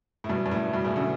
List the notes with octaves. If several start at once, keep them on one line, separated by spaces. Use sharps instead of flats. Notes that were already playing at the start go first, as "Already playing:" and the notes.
A2
G2 B2
G2
A2
G2 B2
A2 C#3
B2 D3